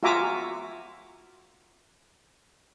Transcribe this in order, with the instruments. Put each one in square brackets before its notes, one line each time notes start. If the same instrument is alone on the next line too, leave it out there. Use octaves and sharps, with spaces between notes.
[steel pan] F4 F#4 E5 G#5 A#5 D6